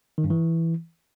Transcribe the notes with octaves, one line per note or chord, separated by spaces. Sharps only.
D#3
G2
E3